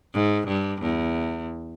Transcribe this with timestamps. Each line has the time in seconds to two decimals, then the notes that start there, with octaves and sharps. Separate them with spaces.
0.14 G#2
0.47 G2
0.82 E2